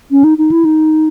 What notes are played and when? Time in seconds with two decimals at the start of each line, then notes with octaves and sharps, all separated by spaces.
0.11 C#4
0.24 D#4
0.38 D#4
0.51 E4
0.65 D#4